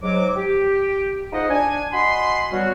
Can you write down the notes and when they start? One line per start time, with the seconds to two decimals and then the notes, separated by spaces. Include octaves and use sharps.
0.02 G#2 F#3 D6
0.36 G4
1.32 D#4 F4 G#4 C5 D#5 F#5
1.49 D4 G#5
1.92 F#4 D#5 G#5 B5 C6
2.51 B2 F#3 G3 B3 C#4 F#4